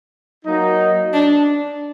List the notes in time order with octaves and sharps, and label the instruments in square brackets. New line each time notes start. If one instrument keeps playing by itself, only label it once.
[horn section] F#3 A#3 D#4
[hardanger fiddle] D4